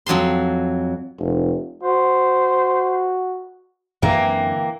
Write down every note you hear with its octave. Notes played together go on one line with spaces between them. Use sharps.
F2 F#3 A5 C6
F1
F#4 C5
F#2 D3 E3 A#3 C4 G5